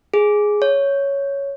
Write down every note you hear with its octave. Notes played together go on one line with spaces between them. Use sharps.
G#4
C#5